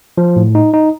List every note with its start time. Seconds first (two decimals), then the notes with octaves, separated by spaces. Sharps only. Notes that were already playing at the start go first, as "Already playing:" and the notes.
0.18 F3
0.36 A2
0.55 D#4
0.74 D#4